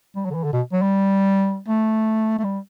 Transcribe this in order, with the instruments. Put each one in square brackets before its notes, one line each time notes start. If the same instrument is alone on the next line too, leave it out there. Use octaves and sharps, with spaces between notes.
[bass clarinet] G3
F#3
D3
E3
D3
B2
F#3
G3
A3
A3
G3